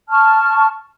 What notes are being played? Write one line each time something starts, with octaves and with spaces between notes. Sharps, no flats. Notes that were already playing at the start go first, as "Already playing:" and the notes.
A5 C#6 F6